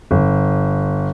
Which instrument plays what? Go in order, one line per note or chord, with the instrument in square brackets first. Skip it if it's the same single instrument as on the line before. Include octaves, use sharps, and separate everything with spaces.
[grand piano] G1